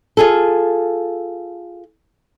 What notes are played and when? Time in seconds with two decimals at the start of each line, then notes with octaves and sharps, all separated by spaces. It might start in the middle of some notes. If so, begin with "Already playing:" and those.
0.17 F4 G#4 A4